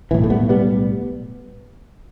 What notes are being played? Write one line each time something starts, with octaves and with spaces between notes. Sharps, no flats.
B1 A2 E3
A3
G3 B3
G3 B3